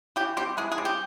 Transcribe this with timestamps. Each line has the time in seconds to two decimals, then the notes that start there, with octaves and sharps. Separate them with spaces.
0.16 E3 G4
0.37 G3 C4 G4
0.57 E3 G#3 G#4
0.72 G#3 G#4
0.78 G3 C4
0.85 G4